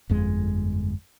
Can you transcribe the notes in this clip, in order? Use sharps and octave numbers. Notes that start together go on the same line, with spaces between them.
G1 F2 G#3